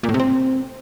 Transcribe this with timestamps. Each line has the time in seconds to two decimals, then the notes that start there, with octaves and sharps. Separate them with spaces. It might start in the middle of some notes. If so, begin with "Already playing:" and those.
0.03 A#2
0.09 A2
0.14 C3
0.20 C4